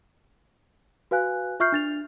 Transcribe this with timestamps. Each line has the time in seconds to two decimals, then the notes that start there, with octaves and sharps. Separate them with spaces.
1.11 F#4 B4 F5 G#5 F#6
1.60 F4 E5 C#6 F6 G6 C7
1.72 D4 A6 F7